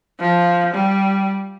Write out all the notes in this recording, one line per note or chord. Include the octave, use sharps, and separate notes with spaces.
F3
G3